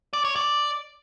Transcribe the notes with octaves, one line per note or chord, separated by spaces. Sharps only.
D5
C#5
D5